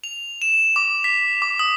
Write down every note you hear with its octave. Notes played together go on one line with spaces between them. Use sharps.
F7
E7
D6
B6
D6
D#6